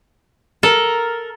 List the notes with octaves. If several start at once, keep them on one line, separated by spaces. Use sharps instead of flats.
A4 A#4